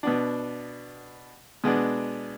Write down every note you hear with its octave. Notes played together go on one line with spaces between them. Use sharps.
B2 B3 D4
B2 G#3 B3 D4